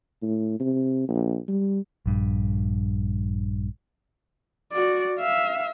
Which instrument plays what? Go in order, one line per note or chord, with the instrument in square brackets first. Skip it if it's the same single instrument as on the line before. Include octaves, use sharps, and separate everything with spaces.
[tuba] A2
C3
A#1
G3
[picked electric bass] A#1 G2
[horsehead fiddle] F#4 D5
E5 F5